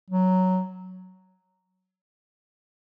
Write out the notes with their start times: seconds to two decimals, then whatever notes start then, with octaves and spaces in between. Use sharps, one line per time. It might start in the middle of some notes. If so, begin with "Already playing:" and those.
0.10 F#3